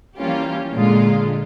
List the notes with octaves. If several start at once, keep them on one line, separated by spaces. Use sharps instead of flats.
E3 G3 A#3 C#4 F4 G4
A#2 D3 G#3 F4